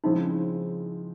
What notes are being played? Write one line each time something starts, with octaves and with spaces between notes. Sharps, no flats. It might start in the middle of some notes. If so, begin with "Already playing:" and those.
C#3 F3 G#3 C4 D#4 E4